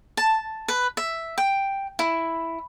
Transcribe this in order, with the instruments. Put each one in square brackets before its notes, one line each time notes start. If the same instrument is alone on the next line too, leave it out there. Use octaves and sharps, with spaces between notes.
[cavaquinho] A5
B4
E5
G5
E4